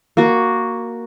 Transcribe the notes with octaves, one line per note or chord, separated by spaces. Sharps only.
A#3 F#4